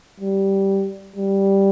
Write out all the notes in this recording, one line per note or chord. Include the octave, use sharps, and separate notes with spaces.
G3
G3